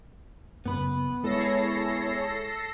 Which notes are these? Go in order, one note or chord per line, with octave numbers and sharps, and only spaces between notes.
F#2 C#3 B3 B4
G#3 E4 G#4 A4 C#5 A#6 C7